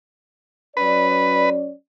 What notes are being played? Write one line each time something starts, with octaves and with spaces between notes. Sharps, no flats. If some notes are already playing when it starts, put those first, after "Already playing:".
F#3 C#4 B4 D5